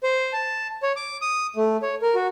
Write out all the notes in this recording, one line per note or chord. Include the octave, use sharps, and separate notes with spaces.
C5
A5
C#5
D6
D#6
A3
C#5
A#4
F#4